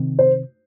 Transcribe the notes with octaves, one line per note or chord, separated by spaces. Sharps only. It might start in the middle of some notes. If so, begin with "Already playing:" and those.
Already playing: C3 D#3 C4
C5